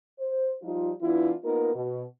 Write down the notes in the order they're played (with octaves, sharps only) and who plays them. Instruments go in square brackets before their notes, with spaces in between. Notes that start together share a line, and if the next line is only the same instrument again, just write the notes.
[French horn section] C5
F3 G3 D#4 F4
E3 B3 D4 E4 F4
A#3 B3 D#4 F4 A#4
B2